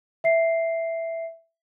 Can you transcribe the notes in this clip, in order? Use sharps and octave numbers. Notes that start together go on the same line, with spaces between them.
E5 C7